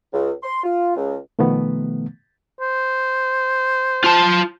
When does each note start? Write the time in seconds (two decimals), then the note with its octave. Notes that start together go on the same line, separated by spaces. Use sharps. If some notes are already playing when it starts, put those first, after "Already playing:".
0.13 C#2
0.43 C6
0.63 F4
0.96 C#2
1.39 B2 D#3 F3 A3 B3
2.60 C5
4.04 F4 A5